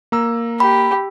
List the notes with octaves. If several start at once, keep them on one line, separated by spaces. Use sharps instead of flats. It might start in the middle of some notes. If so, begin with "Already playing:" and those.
A#3 A#5 E6
G4 B5